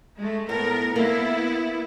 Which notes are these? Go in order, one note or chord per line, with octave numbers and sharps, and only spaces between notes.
G#3 A3
A2 B3 A#4
A#3 B3 E4